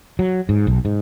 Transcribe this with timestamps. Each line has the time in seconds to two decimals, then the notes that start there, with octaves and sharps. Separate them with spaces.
0.19 F#3
0.49 G#2
0.67 B1
0.85 G#2